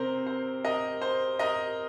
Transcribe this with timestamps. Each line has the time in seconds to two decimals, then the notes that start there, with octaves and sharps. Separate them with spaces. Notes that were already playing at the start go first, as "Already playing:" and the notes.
Already playing: C3 C4 A#4 C5
0.27 C5
0.65 A#4 D#5
1.02 C5
1.39 A#4 D#5